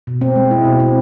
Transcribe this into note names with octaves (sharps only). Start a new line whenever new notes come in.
B2
C4
G#3
E4
B2
C4